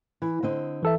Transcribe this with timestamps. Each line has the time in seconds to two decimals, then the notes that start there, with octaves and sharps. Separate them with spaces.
0.22 E3
0.43 D3 C4 D#5
0.83 E3 A4 E5